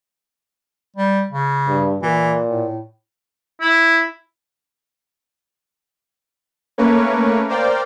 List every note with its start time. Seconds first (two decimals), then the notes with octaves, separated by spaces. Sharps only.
0.96 G3
1.31 C#3
1.68 G2
2.02 A#2 E3
2.47 A2
3.61 E4
6.78 A3 A#3 C#4 A#4 B4 C#5
7.49 A#4 C5 D5 F5 G5